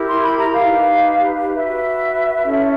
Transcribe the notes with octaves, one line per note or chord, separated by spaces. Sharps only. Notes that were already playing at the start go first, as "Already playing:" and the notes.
Already playing: E4 G4 A#4
C6
B5
A#5
F5
D#4 G4 B4
F#4 B4 E5
C#4 E4 A4